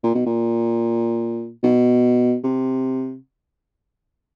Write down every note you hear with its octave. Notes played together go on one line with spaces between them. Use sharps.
A#2
B2
A#2
B2
C3